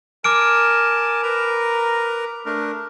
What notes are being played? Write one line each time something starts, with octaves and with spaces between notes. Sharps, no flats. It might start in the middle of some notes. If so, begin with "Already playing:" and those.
A#4 G#5 A5 D6 F6 D7
A#4 B4 A#5
A3 D4 A#4